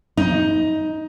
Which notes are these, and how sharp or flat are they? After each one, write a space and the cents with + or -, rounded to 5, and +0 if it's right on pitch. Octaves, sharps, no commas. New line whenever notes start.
D#4 +15